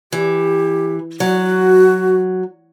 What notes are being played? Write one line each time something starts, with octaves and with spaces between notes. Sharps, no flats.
E3 G4
F#3 F#4